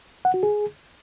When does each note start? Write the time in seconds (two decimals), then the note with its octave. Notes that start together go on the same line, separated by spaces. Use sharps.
0.25 F#5
0.34 F#4
0.43 G#4